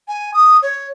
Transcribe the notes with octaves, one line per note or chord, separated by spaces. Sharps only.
G#5
D#6
C#5